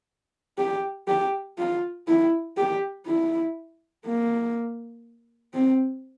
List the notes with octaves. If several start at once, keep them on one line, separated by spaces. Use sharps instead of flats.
G4
G4
F4
E4
G4
E4
A#3
C4